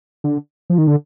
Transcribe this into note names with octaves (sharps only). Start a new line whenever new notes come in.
D3
F3
D#3
D3